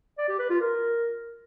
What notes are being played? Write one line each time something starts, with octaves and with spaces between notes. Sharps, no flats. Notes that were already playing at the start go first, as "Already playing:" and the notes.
D5
G4
B4
F4
A#4